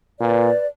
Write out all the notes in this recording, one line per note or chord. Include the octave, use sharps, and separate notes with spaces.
A#2 B4 D5